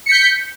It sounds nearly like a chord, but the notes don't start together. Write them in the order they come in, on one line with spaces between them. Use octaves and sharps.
C#7 B6 G6